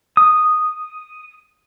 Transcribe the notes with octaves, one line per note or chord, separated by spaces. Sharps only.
D#6